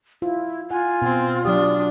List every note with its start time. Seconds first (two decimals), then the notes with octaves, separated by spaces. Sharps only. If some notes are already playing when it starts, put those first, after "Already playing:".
0.22 E4 F4
0.71 F4 F#5 G#5
1.02 B2 C4
1.45 F#3 D4 G4 D#6